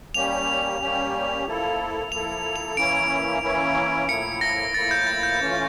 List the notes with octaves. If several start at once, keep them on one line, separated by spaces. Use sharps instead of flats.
G3 A#3 C#4 G4 F7
G3 A#3 C#4 G4
F3 A#3 E4 A4
F3 A#3 E4 A4 F7
F7
E3 A#3 C#4 E4 D7
E3 A#3 C#4 E4
A2 F3 A#3 E4 C#7
A#6
A2 F3 A#3 E4 A6
G6
A6
G6
E3 A3 C#4 F4